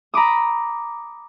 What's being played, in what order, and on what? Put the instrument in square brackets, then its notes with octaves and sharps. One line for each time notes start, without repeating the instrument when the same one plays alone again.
[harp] A#5 B5 D6 D#6